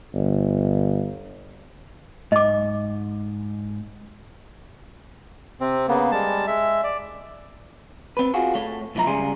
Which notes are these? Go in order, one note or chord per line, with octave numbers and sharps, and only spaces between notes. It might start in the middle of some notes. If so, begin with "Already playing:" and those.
G1
G#2 D#5 D6
C3 C4
C#3 A#3 B3
G3 G#3 A5
G#3 E5
D5
C4 B4
F4 F#4 G#4
A3 C#5
B1 A2 F3 E4 A#5
G#2 C#3 G3 G#4 C6